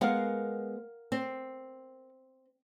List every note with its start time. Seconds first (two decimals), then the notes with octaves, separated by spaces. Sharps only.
0.01 G#3 B3 A#4 F5 F#5
1.12 C4